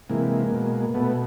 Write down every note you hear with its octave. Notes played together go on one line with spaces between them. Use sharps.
C3 E3 G#3 A#3
B2
B2 A3 B3